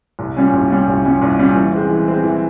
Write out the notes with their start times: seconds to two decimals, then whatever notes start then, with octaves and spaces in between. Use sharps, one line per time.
0.19 C2
0.36 A#2 G3 C#4
0.53 C2
0.70 A#2 G3 C#4
0.87 C2
1.05 A#2 G3 C#4
1.22 C2
1.39 A#2 G3 C#4
1.55 E3
1.73 G#3 C4
1.90 E3
2.07 G#3 C4
2.23 E3